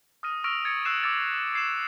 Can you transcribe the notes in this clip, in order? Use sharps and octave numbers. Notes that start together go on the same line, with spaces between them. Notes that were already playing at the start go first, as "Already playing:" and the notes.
D#6 F6 A#6 D#7
C#6 E6 F6 A#6 D7 F7
G#6 A6 C#7
D#6 E6 F#6 C7 E7
D6 E6 A6 C#7 E7
G#6 C7 E7